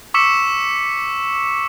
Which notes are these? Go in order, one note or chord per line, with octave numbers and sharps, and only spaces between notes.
C#6 D6 E6 B6 C#7 E7